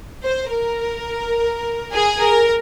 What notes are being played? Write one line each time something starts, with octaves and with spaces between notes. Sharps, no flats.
C5
A#4
G#4
A#4